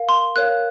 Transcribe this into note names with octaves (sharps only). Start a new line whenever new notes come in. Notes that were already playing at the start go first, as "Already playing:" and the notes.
Already playing: A#4 F5
C6
A#4 C#5 F5 F#6